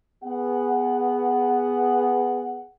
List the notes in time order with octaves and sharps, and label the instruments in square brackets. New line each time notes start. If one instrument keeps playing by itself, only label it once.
[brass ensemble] B3 G#4 F#5